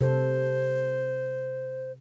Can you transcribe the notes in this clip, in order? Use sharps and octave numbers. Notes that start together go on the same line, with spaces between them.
C3 A4 C5